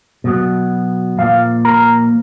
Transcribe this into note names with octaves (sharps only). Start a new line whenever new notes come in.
B2 F#3 B3
A#2 F3 A#3 F5
A#4